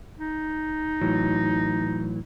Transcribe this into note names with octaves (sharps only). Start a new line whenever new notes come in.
D#4
A2 E3 F#3